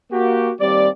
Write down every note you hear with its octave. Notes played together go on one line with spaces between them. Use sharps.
A#3 F#4 G4
D#2 G3 C4 D5